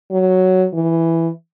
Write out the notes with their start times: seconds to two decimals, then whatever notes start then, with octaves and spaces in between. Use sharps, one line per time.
0.11 F#3
0.74 E3